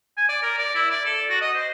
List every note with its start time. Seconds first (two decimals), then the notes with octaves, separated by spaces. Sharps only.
0.17 G#5
0.29 D5
0.43 A#4
0.58 D5
0.75 E4
0.90 D5
1.05 A4
1.30 F#4
1.41 D#5
1.55 C5